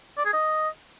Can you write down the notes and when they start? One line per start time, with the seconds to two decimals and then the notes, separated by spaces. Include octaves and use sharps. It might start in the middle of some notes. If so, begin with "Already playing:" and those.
0.18 D5
0.25 G#4
0.33 D#5